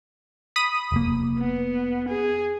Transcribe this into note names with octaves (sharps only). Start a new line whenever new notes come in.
B5 D#6 D#7
F1 A#3
B3
G#4